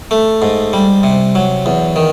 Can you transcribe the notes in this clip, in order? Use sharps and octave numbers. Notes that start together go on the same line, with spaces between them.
A3
G#2
G3
C3
F#3
E2
D#3